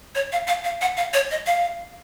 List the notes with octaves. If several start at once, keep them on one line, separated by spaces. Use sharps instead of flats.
C#5
F5
F5
F5
F#5
F5
C#5
D#5
F5